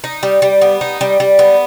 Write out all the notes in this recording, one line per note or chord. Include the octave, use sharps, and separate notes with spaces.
D#4
G3
G3
B3
D#4
G3
G3
B3